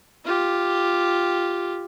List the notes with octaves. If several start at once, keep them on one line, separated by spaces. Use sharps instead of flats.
F4 G4